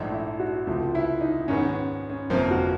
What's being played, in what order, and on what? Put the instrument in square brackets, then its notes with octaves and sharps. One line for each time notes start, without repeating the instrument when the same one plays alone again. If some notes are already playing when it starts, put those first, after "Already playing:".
Already playing: [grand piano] A#1 G#2 F3 A3 D4 [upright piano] D#4
[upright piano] E4
F#4
[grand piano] C#2 C3 F3 A3 [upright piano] F4
[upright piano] E4
D#4
[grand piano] G#2 D#3 G#3 B3 [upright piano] C#4
[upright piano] C#4
C#4
[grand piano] G1 F2 C3 F3 A#3 [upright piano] C4
[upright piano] F#4